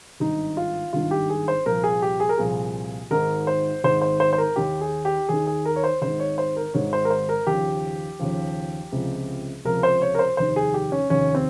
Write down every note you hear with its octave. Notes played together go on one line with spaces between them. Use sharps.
G#1 G2 D#3 D#4
F4
G#1 G2 D#3 F4
G4
G#4
C5
C2 A#2 F3 A#4
G#4
G4
G#4
A#4
C2 A#2 F3 G#4
G#1 G#2 D#3 A#4
C5
G#1 G#2 D#3 C5
C5
C5
C5
A#4
D#2 D#3 G4
G#4
G4
D#2 D#3 G#4
G#4
A#4
C#5
C5
G#1 G#2 D#3 C5
C#5
C5
A#4
G#1 G#2 D#3 C#5
C5
A#4
C5
A#4
D#2 C#3 F3 G4
D#2 C#3 F3
C#2 C3 F3
C#2 C3 F3 A#4
C5
C#5
A#4
C5
F1 D#2 D#3 C5
G#4
G4
C#4
F1 D#2 D#3 C#4
C4